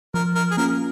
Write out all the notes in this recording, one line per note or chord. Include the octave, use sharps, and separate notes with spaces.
F3 A#4
A#4
G#4
A#3 C#4 F4 A#4